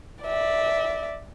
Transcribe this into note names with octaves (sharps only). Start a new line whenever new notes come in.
D5 E5